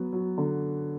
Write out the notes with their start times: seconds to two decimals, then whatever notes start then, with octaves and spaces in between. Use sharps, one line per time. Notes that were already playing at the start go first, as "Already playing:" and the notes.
Already playing: F#3 B3
0.13 F#3
0.38 D3